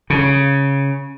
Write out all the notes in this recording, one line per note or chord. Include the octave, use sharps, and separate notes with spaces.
C#3